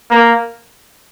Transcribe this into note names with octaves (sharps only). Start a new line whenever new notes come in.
A#3